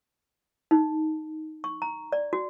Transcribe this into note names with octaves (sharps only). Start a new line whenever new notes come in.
D#4
C#6
A#5
D5
F#4